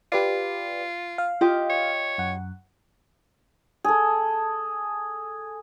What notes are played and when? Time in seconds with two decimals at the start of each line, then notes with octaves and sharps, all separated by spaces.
0.12 F4 G4 B4 D5
1.18 F5
1.41 F4 G4 D#5
1.70 C#5
2.18 F#2 F#5
3.84 G#4 A4